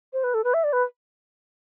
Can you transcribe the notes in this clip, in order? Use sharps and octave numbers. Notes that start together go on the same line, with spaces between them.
C5
B4
A4
B4
E5
D5
B4